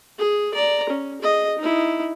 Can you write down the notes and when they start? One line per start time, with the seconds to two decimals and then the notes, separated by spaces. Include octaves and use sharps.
0.19 G#4
0.54 D5 A#5
0.90 C#4
1.22 G#4 D#5
1.58 D#4 E4